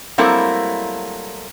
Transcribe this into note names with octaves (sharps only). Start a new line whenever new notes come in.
F#3 G3 A3 A#3 C4 E4